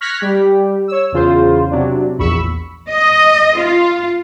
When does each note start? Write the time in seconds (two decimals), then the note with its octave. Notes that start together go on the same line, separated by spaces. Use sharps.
0.01 C#6 F6 F#6 G#6 A#6 B6
0.21 G3 G4
0.88 C#5 E6
1.12 E2 C#3 F4 C5
1.70 C3 F#3 D4
2.18 A#1 E2 B5 C#6 E6
2.90 D#5
3.58 F4